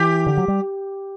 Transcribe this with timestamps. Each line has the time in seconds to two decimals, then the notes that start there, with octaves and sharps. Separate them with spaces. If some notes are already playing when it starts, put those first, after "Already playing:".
Already playing: E3 G4
0.26 D3
0.37 F#3
0.48 G3